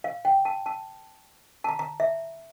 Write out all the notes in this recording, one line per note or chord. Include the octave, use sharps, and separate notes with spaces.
F5
G5
A5
A5
A5
A#5
A#5
E5